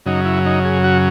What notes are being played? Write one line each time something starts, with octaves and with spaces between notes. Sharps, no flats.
F#2 C#3 F#3 D#4
E4
D#4
G#4
F#4